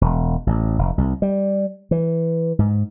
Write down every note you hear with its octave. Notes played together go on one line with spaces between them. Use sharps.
E1
A1
F1
C2
G3
E3
G#2